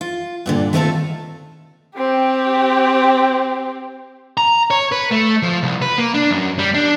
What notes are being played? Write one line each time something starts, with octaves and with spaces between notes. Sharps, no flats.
F4
G2 A#2 D3
D#3 A3 B3 C4 F4 A4
C4 G4
A#5
C#5
B4
A3
F3
C2
B4
A#3
D4
F#2
G3
D4